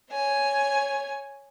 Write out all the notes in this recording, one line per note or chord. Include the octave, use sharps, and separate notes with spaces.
C#5 G#5